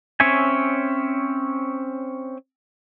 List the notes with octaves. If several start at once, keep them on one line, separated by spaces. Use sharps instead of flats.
C4 C#4 C#5 E5 G#5